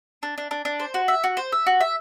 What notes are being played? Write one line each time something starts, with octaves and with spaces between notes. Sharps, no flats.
D4
D4
D4
D4
C5
F#4
E5
F#4
C5
E5
F#4
E5